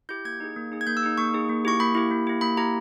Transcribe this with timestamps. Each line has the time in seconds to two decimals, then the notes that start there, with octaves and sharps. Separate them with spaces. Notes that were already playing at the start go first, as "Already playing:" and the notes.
0.09 E4 G4 G6
0.25 A#3 G#6
0.40 D#4 G#4
0.56 A#3
0.72 D#4 G#4
0.81 G#6
0.87 A#3 G6
0.97 E6
1.03 D#4 G#4
1.18 A#3 C#6
1.34 D#4 G#4
1.49 A#3
1.65 E4 G4 C#6
1.80 A#3 B5
1.95 E4 G4
2.11 A#3
2.27 E4 G4
2.41 A#3 B5
2.57 E4 G4 A#5